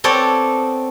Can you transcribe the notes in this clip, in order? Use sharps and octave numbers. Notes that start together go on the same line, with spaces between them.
B3 C4 A4 C#5 D5